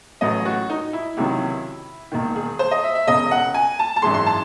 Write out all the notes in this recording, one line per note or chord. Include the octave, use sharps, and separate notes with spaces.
A1 A2 F#3 D#5
F#4
D#4
E4
C#2 C3 D#3 F#3
E1 D#2 D#3
G#4
C5
D#5
E5
E5
E1 E2 C#3 D#5
F#5
G#5
A5
A5
G#1 F#2 E3 G#3 C6
C6
A5